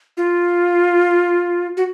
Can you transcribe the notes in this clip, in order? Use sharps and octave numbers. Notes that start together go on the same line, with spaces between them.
F4
F#4